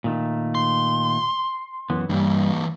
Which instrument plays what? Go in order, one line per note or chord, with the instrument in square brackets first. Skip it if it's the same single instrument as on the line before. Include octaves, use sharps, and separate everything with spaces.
[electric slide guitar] A#2 D#3 A3
[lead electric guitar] C6
[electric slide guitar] F#2 E3 B3
[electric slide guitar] G2 G3 [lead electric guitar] E3 A#3